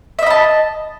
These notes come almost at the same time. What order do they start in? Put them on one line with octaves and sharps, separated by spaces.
E5 D#5 B5 A5